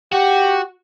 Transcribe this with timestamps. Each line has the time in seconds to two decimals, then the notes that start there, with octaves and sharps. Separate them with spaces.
0.13 F#4 G4